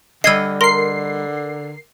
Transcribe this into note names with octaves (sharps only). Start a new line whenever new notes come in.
D3 G3 D#5 E6 G#6 C7
A#4 C6 C7